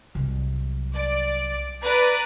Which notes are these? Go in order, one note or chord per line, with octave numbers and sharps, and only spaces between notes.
C2 F#3
D5
B4 D5 A#5